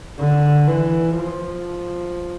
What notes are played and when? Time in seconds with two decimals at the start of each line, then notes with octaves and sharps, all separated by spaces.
0.18 D3
0.68 E3
1.16 F3